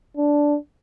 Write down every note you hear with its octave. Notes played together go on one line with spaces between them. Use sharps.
D4